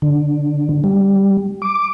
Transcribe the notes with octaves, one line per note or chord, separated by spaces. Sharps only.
D3
G3
D6